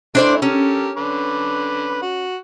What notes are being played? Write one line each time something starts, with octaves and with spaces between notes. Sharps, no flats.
E3 A3 D4 E4 C5 D5
C#4 G4 A4 A#4
D3 B4 D6
F#4